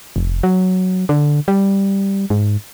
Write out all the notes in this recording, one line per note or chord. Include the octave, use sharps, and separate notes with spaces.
F1
F#3
D3
G3
G#2